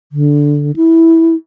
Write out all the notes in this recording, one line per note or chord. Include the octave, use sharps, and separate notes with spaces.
D3
E4